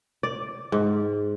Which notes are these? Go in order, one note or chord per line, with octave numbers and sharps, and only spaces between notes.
D5
G#2